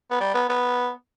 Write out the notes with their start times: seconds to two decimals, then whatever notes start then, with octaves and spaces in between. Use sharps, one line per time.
0.11 B3
0.20 G3
0.34 B3
0.49 B3